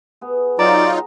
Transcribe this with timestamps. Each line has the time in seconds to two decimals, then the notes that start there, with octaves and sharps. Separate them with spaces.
0.21 B3 G#4
0.59 F#3 D#4 F4 D5 A#5